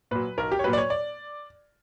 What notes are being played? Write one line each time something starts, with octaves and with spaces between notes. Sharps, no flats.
A#2 F#3 B4
B1 A#4
G4
C#5
A#2 F#3 B4
D5
C#5
D5